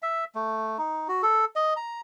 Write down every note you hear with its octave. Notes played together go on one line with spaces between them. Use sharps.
E5
A3
D#4
F#4
A4
D#5
A#5